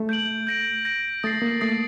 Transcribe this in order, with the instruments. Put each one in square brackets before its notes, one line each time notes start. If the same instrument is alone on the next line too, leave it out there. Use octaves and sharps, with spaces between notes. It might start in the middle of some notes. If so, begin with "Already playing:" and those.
Already playing: [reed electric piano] A3
[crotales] G6 D7 F#7
G6 A#6 D7
G6 A#6 D7
[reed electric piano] A3 [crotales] D#6 A6 C7
[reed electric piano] A#3
[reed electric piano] A3 [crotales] D#6 A6 C7